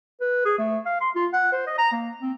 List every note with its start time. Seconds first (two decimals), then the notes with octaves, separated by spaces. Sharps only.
0.21 B4
0.45 G#4
0.58 A3
0.86 F5
1.00 C6
1.15 F4
1.33 F#5
1.52 C5
1.67 D#5
1.78 A#5
1.92 A#3
2.21 C4